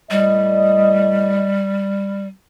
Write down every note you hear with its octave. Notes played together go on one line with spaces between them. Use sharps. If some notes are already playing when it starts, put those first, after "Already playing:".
A2 G3 D5 D#5